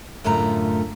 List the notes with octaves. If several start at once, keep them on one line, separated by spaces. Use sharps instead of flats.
F#2 A2 D3 A3 F4 A#5